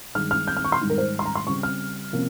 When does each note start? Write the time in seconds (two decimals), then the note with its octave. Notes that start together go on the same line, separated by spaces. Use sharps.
0.15 G2 D#3 G#3 F6
0.31 F6
0.47 G6
0.57 F6
0.64 C#6
0.72 C6
0.81 G#2 D#3 G3
0.90 A#4
0.98 C5
1.19 C6
1.25 A#5
1.35 C6
1.46 C#3 G3 C4 C#6
1.63 F6
2.13 C3 F3 A#3 C#4